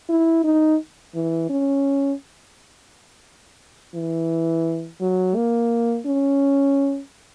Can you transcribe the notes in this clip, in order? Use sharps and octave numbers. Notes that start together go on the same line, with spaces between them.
E4
D#4
E3
C#4
E3
F#3
A#3
C#4